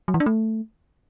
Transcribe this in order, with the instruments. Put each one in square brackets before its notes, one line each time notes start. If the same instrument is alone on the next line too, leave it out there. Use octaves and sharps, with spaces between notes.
[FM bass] F#3
E3
D4
A3